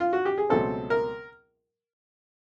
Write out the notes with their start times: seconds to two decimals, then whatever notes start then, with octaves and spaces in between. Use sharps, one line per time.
0.00 F4
0.13 F#4
0.25 G4
0.38 G#4
0.49 C#2 B2 F#3 A3 C4 A4
0.90 A#4